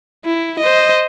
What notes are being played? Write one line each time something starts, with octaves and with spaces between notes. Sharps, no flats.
E4
C5 D#5